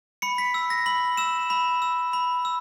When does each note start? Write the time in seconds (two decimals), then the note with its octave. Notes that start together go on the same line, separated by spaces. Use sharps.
0.22 B5 C#7
0.38 B6
0.54 E6
0.70 A#6
0.86 B5 F#7
1.17 E6 E7
1.50 B5
1.82 E6
2.13 B5
2.45 E6